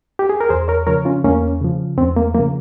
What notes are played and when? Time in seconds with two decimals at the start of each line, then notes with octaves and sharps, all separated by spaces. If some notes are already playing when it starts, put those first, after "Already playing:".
0.19 G4
0.30 G#4
0.41 A#4
0.49 E2 G#4 C5
0.68 A#4 C#5
0.87 C#3 F3 A#4 C#5
1.05 C#4 F4
1.24 E2 A#3 C#4
1.61 C#3 F3
1.97 E2 C4
2.17 A#3
2.34 C#3 F3 A#3